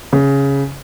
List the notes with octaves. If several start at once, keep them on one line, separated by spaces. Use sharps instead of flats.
C#3